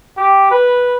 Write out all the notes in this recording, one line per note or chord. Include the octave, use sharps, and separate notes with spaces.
G4
B4